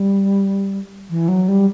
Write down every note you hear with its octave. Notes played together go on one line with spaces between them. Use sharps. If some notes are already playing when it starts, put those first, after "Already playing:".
Already playing: G3
E3
F#3
G3